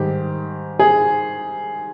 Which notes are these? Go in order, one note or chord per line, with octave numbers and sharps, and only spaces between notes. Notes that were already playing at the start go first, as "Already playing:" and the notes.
Already playing: G#2 D#3 G3 G4
G#4